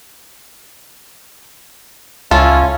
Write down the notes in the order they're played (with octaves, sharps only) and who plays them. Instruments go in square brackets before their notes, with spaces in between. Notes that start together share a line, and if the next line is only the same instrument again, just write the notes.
[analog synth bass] C#2 [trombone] C#4 [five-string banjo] E4 A4 [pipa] F4